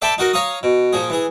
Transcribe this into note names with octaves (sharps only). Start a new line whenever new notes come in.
A4 D5 E5 G5 A5 B5
D#4 F#4 A#4
C#5 F5 A#5 C#6 D#6
B2
A#2 F3 G#4
E3 G#4